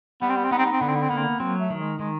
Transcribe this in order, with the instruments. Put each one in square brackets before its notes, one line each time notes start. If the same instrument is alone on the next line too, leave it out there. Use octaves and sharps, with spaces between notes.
[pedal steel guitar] G3 [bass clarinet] B3
[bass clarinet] C4
B3
C4
[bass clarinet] B3 [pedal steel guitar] D#4
[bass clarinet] C4
B3
C4
[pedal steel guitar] D3 [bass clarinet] B3
[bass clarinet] C4
B3
C4
[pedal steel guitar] A#3 [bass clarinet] B3
[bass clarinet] C4
B3
[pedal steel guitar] F#3 [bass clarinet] C4
[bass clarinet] A3
[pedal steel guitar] D#3
[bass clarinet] G#3
[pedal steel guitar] D#3 [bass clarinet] G#3